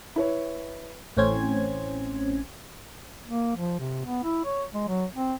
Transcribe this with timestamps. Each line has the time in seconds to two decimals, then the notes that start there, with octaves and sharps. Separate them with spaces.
0.16 E4 B4 C#5
1.17 A1 A2 C4 C#4 C5 G#6
3.27 A#3
3.57 F3
3.79 C3
4.06 B3
4.23 E4
4.45 C#5
4.74 G#3
4.88 F#3
5.15 C4